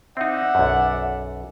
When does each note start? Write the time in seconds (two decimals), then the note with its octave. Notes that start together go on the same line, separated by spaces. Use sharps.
0.17 C4 D#4 D5 E5 F#5
0.55 B1 F#2